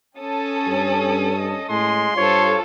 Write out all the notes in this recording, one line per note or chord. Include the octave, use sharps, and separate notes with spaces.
C#4 A4 A5 D#6
G2
D#5
A2 G#3 C6
G2 F4 A4 C5 C#5